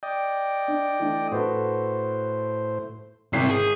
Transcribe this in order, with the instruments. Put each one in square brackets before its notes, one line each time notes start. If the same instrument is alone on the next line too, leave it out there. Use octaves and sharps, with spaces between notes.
[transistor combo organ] D5 D#5 G5
[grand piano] D4
E3 A3 D4
[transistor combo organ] A2 C5 [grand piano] F#4 A4 B4
[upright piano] G#1 B6 C7 [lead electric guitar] C3 E4
[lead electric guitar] G#4